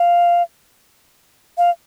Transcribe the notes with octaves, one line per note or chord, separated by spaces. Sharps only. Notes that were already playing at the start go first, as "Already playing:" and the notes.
Already playing: F5
F5